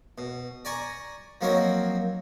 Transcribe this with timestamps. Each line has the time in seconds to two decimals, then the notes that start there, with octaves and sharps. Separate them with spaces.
0.18 B2
0.65 D5 G#5 A#5 C#6
1.41 F3 F#3 A#3 C4 D#4 C#5